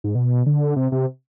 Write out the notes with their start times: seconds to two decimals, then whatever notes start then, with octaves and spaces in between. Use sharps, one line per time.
0.04 G#2
0.15 B2
0.46 D3
0.76 C3
0.92 C3